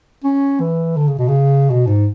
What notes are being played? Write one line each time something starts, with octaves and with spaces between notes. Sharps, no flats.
C#4
E3
D3
C#3
B2
C#3
B2
G#2